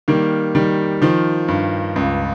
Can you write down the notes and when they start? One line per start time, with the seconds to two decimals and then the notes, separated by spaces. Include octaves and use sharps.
0.08 D#3 G3 A#3
0.55 D#3 G3
1.02 D#3 F3
1.48 G2
1.96 C#2